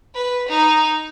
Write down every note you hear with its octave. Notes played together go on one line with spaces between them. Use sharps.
B4
D#4